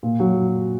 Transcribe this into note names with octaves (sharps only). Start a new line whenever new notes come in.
A#2
F#3